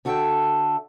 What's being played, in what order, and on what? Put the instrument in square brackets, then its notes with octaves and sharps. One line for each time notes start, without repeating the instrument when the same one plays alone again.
[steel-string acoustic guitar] D3 F#4 A4 A#4 E5 G5